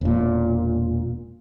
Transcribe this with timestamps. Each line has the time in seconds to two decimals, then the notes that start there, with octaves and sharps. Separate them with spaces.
0.01 E1 A#2